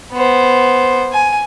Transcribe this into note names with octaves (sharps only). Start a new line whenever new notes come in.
B3 C5
G#5